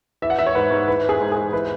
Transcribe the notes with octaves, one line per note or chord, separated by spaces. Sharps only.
E3 E5
F#5
E3 E5
C#5
G#2 B4
G#2
E3 B4
E3
G#4
G#2
G#2 G#4
E3 B4